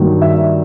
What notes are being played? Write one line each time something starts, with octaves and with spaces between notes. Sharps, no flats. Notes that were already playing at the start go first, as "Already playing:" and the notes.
Already playing: G2 D#3 F#3 A#3
E5